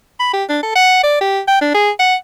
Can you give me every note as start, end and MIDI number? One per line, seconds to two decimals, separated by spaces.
0.20 0.30 83
0.33 0.44 67
0.49 0.58 62
0.63 0.72 69
0.76 0.99 78
1.04 1.19 74
1.21 1.40 67
1.48 1.58 79
1.61 1.70 62
1.75 1.90 68
2.00 2.15 78